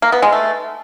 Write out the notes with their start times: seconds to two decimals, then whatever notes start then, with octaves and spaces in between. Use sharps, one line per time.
0.02 A#3
0.12 B3
0.22 G#3
0.32 A3